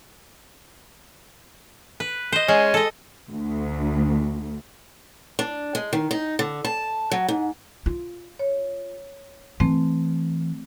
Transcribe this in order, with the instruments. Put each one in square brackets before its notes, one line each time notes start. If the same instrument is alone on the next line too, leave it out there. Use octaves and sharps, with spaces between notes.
[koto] B4
C5 D#5
[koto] G#3 [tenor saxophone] C#4
[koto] A4 D#5
[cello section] D2
[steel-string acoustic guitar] D4
G#3
D#3
D#4
D3
A5
F#3
G#2
[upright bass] F4
[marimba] C#5
[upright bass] E3 [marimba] A3 C4